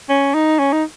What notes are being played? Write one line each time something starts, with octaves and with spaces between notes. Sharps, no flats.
C#4
D#4
C#4
D#4